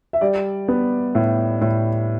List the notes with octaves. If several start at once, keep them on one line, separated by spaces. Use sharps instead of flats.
E5
G3 D5
B3
A2
A2